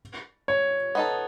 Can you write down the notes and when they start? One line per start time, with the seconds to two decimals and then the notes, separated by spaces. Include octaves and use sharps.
0.48 C#5
0.95 B3 D#4 A4